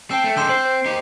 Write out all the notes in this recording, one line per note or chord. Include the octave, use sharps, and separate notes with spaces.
C4 G5 A5 E6
A3
D3 G#3 C6 E6 G6
C4 C5
C5
D#4 G4